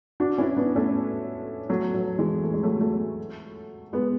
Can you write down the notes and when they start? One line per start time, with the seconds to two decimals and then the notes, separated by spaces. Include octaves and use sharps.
0.20 D4 F#4
0.38 C#4 E4
0.57 B3 D4
0.76 A3 C#4
1.69 F#3 A3
1.94 F#3
2.19 E3 G#3
2.43 A3
2.53 G#3
2.63 F#3 A3
2.81 F#3 A3
3.93 G#3 B3